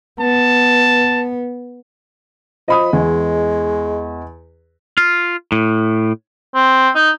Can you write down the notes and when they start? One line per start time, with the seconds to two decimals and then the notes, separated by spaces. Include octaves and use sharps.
0.21 B3 A5
2.68 F3 D#5 B5 D#6
2.93 E2 G#3 D#5
4.98 F4
5.52 A2
6.55 C4
6.95 D#4